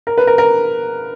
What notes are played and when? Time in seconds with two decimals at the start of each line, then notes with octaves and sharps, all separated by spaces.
0.07 A#4
0.18 B4
0.27 A#4
0.38 A#4